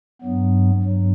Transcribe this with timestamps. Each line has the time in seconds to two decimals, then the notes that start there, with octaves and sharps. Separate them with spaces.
0.22 G2 F#3 B3
0.83 G2 F#3